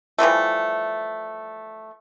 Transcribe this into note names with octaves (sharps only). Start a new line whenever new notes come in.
E3 F3 G3 A3